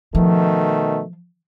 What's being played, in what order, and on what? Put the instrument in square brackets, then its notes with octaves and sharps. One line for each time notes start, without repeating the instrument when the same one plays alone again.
[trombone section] B2 D#3 A3 [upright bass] F3